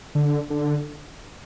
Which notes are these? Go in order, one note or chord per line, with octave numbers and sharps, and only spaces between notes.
D3
D3